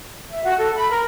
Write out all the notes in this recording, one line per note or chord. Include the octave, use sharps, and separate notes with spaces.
E5
F#4
A4
B5
A#4